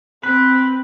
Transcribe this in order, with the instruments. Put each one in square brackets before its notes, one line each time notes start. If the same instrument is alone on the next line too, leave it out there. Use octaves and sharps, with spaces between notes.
[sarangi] C4 [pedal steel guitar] B4